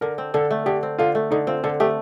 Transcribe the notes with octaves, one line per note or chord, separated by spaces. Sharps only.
D3 A#4
C4
D3 A4
A3
D3 G4
C4
D3 F4
A3
D3 D#4
C4 F4
D3 A4
A3 G4